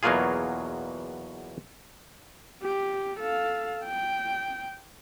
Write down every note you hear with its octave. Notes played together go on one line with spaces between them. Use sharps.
E2 B2 F#3 A#3 F4 G#4
G4
A4 F5
G5